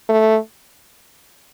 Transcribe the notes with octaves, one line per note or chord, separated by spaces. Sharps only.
A3